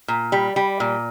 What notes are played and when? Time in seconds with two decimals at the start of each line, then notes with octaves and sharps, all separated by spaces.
0.08 A#2
0.32 G3
0.56 G3
0.80 A#2